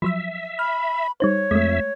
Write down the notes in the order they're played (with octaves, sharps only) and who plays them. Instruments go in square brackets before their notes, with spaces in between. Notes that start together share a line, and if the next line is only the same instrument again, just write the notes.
[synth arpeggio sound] F3 F#3 E6 [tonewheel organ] E5
[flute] B5 [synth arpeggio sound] F6
[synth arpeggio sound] G3 D#4 C5 [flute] C#5
[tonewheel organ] F2 E5 [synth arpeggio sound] G#3 A3